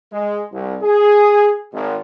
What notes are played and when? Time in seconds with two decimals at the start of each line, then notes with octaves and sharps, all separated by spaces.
0.12 G#3
0.52 C2
0.82 G#4
1.72 G#1